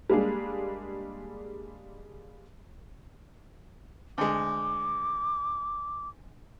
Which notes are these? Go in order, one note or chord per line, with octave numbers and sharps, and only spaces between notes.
G3 G#3 A#3 D4 G#4
D2 G#3 D6